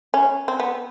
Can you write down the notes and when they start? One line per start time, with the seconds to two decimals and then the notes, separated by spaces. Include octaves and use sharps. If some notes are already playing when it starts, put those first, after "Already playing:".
0.14 C#4
0.48 C4
0.60 B3